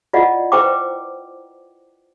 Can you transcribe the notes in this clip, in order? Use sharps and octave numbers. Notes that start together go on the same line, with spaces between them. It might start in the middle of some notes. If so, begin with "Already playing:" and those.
E4 F4 D5 D#5 F#5
E4 B4 C5 G5 A#5 D6